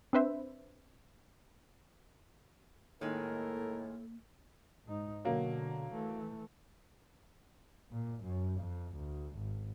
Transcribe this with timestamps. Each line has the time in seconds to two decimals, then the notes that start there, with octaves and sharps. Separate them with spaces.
0.13 C4 D4 B4 C5 E5
3.01 A2 D#3 G#3 A#3 A4 A#4
4.86 G#2 D#4
5.25 B2 D3 F#3 A#3
5.93 E3 A3
7.92 A#2
8.24 F#2
8.60 F2
8.96 D2
9.37 G#1